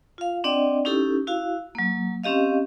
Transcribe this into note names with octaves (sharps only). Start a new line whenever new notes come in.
F4 F5
C4 D4 D5 D#5 F#5 G5
C#4 D#4 E4 G4 A4
E4 F#4 F5
F#3 A#3
C4 C#4 G4 D#5 F5